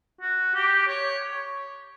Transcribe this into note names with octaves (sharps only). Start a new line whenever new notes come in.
F#4
G4
C#5